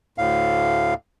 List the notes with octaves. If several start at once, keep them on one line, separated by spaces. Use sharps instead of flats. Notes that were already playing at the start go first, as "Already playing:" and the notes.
D2 A2 F5